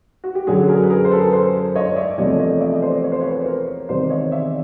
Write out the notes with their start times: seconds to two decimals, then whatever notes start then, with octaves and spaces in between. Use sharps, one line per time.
0.24 F#4
0.35 G4
0.47 F#2 D3 F#3 F#4 G#4
0.68 G#4 A#4
0.83 B4
0.90 G#4 A#4
1.05 C5
1.11 A4 B4
1.33 A#4 C5
1.76 C#5 D#5
1.96 D5 E5
2.18 E2 C3 F3 A3 C#5 D#5
2.33 D5
2.39 C#5 D#5
2.60 D5 E5
2.73 D#5
2.82 C5 D5
3.04 C#5
3.12 C5
3.21 B4 C#5
3.46 A#4 C5
3.89 E2 C3 D#3 C5 D5
4.10 C#5 D#5
4.32 D5 E5